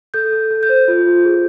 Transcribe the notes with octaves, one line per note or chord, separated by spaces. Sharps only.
A4 G6
A4
A4
G6
C5
F4
F4
G#4